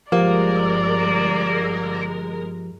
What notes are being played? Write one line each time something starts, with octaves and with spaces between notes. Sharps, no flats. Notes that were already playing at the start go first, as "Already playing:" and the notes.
G1 F3 G#3 A#3 G4 A#4 D5